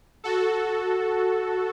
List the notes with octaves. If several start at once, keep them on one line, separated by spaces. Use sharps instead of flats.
F#4 A4